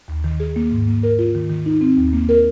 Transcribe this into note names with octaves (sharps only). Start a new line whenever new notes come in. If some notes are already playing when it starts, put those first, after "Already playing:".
D#2
D#3
G#4
A#3
G#2
A#3
A#4
F4
D#3
D#3
D#4
C4
D#2
A#3
A#4